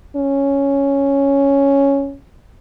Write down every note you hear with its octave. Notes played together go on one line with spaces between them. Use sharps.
C#4